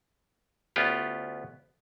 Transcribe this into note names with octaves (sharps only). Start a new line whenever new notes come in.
D2 B3 C#4 F4 G4